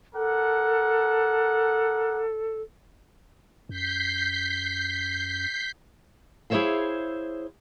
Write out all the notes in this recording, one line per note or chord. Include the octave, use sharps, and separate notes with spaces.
D4 A4 A#4 F#5
F#2 G6 B6 C7
E4 G#4 C5 C#5 E5 F5